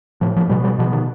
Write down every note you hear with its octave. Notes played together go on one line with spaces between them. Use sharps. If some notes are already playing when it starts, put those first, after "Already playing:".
A2 F3
F3
B2 G3
G3
B2 F3
D#3